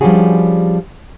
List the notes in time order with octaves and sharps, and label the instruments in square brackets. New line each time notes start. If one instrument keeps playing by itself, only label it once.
[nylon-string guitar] F3 G3 C#4 D4 F#4 G#4